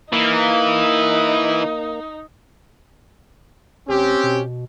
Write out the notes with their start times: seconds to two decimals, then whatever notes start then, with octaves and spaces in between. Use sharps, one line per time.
0.13 E3 A#3 D#4
3.88 E1 C4 C#4 G4
4.23 B2